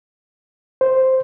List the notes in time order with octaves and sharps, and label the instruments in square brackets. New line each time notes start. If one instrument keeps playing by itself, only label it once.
[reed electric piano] C5